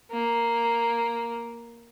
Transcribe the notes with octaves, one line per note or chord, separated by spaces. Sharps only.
A#3